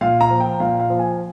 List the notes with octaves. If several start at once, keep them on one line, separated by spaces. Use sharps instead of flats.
A#2 F5
A#5
F3
G5
A#2 F5
F5
F3
G#5